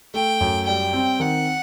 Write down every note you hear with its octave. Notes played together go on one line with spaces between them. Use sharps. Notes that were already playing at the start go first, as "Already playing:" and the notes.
A3 G5
F#2
G3 G5
C4
D#3 F#5